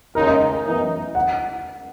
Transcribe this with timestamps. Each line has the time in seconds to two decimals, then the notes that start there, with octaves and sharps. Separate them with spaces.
0.15 D#2 C#3 G#3 D#4 A#4
0.27 D#5
0.52 A#4
0.66 F#2 E3 B3 D#4
1.15 F#5